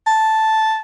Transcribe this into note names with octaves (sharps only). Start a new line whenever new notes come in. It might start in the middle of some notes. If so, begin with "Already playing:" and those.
A5